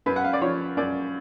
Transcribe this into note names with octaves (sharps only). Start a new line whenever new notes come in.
F#2 B4
F#5
F5
D5
F3 C#5
F#2 D5